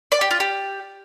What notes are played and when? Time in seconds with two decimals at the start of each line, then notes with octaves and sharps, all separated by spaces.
0.12 D5
0.21 G4
0.31 F4
0.40 G4